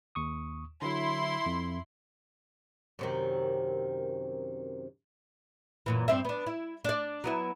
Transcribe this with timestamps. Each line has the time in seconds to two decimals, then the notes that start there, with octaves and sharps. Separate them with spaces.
0.15 D#2 C#6 D#6
0.82 D3 F#3 E4 C6
1.46 F2
2.99 F#2 C3 D#3
5.86 F#2 A#2 E3
6.08 G2 C4 E5
6.25 B3 D4
6.47 E4
6.84 D4 D5
7.24 F#3 B3 E4